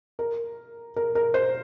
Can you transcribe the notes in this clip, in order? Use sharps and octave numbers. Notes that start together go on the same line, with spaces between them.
A#4
A#4
A#4
C5